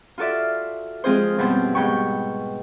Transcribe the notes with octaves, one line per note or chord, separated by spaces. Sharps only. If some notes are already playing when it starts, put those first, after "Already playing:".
F4 F#4 A4 D5 E5
F3 G#3 C4 F4 G#4 C5
F#2 B2 F3 G3 C5
G#2 B3 G5 C#6